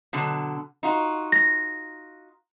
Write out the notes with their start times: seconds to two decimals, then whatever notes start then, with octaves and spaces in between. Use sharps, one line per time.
0.13 B2 D3 F#3
0.83 D#4 F4 F#4
1.32 A#6